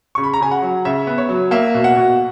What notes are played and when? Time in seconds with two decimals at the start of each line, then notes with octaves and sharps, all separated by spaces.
0.15 C#3 C#6
0.24 B5
0.33 A#5
0.41 C#3 G#5
0.51 F#5
0.62 F#3
0.85 C#3 E5
1.07 B3
1.18 C#5
1.29 F#3
1.51 A#3 E5
1.74 B2
1.84 F#5
1.96 B2